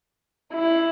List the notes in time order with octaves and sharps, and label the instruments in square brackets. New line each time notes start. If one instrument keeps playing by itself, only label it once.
[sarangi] E4